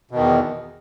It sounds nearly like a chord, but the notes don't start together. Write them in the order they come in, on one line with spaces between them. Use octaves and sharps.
B2 D#3 E2